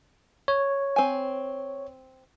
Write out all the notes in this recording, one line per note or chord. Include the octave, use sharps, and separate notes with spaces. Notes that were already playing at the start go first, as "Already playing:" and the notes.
C#5
C4 G#5